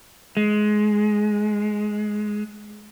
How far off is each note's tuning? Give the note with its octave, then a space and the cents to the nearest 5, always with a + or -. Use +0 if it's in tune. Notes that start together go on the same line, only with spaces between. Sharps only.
G#3 +15